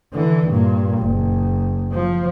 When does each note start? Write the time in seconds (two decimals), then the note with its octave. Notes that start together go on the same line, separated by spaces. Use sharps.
0.13 D3 E3
0.48 G2 A#2
0.99 F#1
1.92 F3